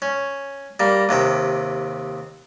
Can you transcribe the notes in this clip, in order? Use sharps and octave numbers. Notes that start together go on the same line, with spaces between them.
C#4
G3 A#3
D#2 C3 G5